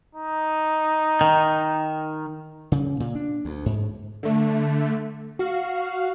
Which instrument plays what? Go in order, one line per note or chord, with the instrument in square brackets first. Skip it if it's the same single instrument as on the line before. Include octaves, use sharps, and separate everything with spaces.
[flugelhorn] D#4
[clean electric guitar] D#3
[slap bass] C#3
A#2
D4
D2
G#2
[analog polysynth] D3 A3
F#4 F5